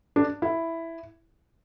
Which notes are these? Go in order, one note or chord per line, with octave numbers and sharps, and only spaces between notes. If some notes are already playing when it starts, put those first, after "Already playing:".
D4
E4